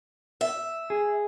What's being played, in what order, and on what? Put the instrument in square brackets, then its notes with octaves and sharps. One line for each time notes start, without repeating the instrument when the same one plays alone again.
[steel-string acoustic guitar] E5
[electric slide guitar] G#4